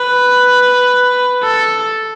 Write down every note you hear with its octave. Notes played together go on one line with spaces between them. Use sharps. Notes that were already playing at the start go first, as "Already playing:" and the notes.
Already playing: B4
A4